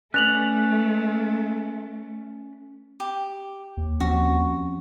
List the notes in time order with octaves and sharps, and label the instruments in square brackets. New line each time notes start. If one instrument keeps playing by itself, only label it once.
[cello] A3 [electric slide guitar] C#4 B4 D5 [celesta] F#6 F7 F#7
[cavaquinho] G4
[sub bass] D#2
[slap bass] F3 C4 C#4 [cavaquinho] F#4